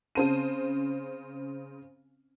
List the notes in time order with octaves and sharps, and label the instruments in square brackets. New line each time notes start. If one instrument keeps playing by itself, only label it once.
[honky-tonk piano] C#3 C5 D#7 [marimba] C4 C#4 A5